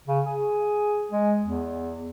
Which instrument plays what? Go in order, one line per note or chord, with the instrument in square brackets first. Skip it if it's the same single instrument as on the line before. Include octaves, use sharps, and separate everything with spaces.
[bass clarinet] C#3
G#4
G#3
E2